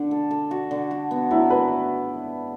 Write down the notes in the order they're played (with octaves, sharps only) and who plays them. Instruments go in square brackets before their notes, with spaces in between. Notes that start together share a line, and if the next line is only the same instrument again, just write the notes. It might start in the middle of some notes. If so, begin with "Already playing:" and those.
Already playing: [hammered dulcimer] D3 [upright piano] D4
[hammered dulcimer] A4
A4
F#4
D3
F#4
B3
[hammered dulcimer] F#3 [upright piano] E4
[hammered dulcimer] F#4 [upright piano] B4